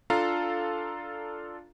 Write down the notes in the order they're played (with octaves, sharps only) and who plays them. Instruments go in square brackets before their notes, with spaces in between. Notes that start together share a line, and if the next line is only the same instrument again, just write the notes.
[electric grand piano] D4 F4 A4 F5 A#5